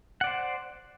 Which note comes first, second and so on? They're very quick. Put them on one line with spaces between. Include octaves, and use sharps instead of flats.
F#5 D5 C5